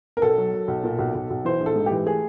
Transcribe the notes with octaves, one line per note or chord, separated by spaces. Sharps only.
A#4
B1 A4
F#3
F#3
B1
A#2
B1
B1
B1
E3 C5
A#1
A4
G#2
G4
E3
A3 G#4